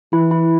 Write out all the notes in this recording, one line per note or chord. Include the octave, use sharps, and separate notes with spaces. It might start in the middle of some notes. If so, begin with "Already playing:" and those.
E3 E4
E4